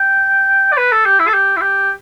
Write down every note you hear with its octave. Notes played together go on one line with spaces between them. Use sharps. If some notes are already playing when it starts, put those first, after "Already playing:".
Already playing: G5
D5
B4
A4
G4
E4
A4
G4
E4
G4